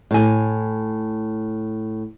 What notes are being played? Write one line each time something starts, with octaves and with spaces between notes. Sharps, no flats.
A2 G#5